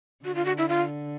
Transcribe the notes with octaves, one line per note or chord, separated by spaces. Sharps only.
D3 F#4
F4
F#4
E4
F4